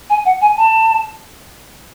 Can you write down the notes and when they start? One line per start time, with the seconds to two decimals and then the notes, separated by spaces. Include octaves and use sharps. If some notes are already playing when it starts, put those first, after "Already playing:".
0.10 G#5
0.25 F#5
0.41 G#5
0.57 A5